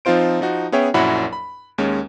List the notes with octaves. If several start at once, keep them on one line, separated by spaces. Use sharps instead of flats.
F3 C4 D#4 F4 C5 D7
F3 D#4 F#4
B3 C#4 G#4 C#5 E5 G5
A#1 F#2 F#3 E4 F#5 B5
B5
D#2 G#3 C#4